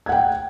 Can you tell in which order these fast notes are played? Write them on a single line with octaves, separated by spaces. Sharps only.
G#6 F#5 G5